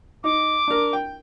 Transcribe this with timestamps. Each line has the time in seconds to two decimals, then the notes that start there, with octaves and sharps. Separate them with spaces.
0.24 D#4 D6
0.67 D4 A#4
0.93 G5